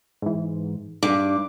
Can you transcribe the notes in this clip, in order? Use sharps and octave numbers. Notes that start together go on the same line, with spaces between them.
G#2 E3
G2 D6